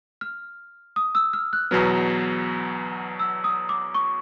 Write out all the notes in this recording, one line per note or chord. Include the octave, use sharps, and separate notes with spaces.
F6
D#6
E6
F6
F#6
E2 B2 F#3 B3 F6
E6
D#6
D6
C#6